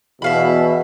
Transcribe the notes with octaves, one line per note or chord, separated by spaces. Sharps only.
E2 B2 E5 F5 B5